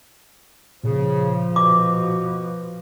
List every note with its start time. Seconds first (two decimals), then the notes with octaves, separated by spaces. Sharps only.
0.84 A#2 C#3 F3
1.56 B2 F#4 D6